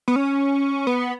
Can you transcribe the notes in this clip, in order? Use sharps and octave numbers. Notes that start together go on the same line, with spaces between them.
B3
C#4
B3